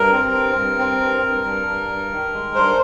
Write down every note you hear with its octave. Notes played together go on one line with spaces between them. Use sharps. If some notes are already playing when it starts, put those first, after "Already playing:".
Already playing: G2 A#4
C4
G2
G2
C4
G2
G2
G2
G2
G2
D#3
G#3
G2 C5